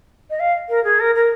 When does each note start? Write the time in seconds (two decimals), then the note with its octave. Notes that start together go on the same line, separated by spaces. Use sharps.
0.30 D#5
0.39 F5
0.69 A#4
0.84 G#4
0.99 A#4
1.15 A#4